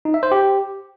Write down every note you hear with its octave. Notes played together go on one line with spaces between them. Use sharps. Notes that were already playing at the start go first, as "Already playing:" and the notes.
D#4
E5
C5
G4